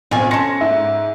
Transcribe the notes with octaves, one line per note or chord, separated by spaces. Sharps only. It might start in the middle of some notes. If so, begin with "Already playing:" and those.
B1 C4 F4 G#5
C#4 A4 C6 A#6 C#7
G#2 E5